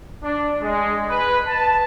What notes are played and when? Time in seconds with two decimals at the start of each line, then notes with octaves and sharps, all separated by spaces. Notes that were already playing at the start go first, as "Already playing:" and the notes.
0.23 D4
0.61 G#3
1.08 B4
1.48 A5